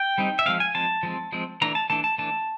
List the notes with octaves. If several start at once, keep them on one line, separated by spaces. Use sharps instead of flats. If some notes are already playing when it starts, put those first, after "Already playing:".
Already playing: G5
G3 C4 D#4
E5
F3 G#3 C4 F5
G#5
F3 G#3 C4 A5
F3 G#3 C4
F3 G#3 C4
E3 A3 D4 A#5
A5
E3 A3 D4 A5
A5
E3 A3 D4 A5